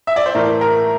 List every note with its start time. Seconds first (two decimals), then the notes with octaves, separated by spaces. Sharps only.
0.07 E5
0.16 D5
0.26 C5
0.35 A2 E3 A3 A#4
0.61 A#4